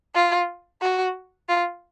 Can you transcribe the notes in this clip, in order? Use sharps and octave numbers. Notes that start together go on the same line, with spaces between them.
F4
F#4
F4